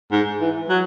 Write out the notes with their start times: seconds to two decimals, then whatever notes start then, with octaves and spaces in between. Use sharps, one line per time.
0.12 G#2
0.41 E3
0.69 F#3